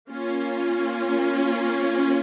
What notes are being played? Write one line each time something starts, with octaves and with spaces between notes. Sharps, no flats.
A#3 C#4 F4